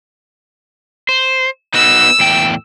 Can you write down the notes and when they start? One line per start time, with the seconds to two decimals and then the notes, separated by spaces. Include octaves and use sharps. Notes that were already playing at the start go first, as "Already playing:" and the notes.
1.09 C5
1.74 B3 D#4 F#4 E6
2.20 E2 A2 G5